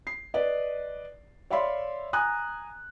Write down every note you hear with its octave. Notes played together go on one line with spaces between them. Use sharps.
C7
B4 D5 D#5
C#5 D5 E5 F5 B5 C6
G#5 A#5 D#6 F#6